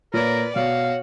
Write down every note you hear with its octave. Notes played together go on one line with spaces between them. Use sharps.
A#2 A#4 B4 C#5 D5
B2 F#4 C#5 F5